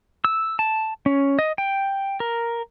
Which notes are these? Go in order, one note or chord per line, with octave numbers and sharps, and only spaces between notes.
E6
A5
C#4
D#5
G5
A#4